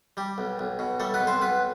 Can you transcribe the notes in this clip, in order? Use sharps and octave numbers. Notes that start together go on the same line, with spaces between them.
G3 G4
B1
B1
B2
G3 A3 A4
B3 B4
B1
C4 C5
B1 B3 B4